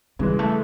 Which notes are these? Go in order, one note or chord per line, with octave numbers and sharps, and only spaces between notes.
C#3 E3 G3 G#3
A3